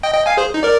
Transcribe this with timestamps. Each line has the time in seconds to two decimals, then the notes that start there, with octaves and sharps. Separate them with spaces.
0.03 D#5 G5
0.14 D#5 G5
0.26 F5 G#5
0.37 G#4 C5
0.54 D#4
0.63 A#4 D5